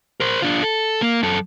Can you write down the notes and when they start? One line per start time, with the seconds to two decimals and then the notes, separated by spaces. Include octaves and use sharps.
0.20 A#4 C5
0.42 D4 F4
0.62 A4
1.02 A#3
1.23 F#2 A4